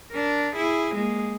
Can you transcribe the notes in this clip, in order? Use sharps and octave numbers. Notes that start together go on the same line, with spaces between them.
D4 A#4
E4 G#4
G#3 A#3